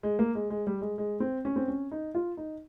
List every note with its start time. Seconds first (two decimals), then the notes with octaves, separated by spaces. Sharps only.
0.03 G#3
0.19 A#3
0.35 G#3
0.50 G#3
0.67 G3
0.81 G#3
0.98 G#3
1.20 C4
1.45 C#4
1.56 C4
1.68 C#4
1.91 D#4
2.15 F4
2.37 D#4